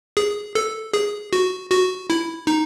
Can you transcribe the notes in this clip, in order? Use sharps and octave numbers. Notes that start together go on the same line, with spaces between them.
G#4
A4
G#4
F#4
F#4
E4
D#4